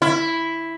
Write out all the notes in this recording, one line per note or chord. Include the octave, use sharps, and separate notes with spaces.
E4